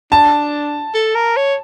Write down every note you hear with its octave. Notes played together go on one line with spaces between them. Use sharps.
D4 A5
A4
A#4
C#5